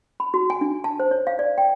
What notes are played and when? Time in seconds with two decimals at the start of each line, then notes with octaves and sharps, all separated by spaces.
0.20 B5
0.34 F#4
0.50 G#5
0.61 D4
0.84 A5
1.00 C5
1.11 C#5
1.27 F5
1.39 D5
1.58 G5